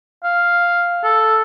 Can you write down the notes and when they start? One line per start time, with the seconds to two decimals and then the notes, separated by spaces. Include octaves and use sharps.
0.24 F5
1.04 A4